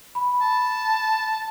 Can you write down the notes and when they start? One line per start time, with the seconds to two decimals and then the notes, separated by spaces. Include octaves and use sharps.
0.15 B5
0.41 A5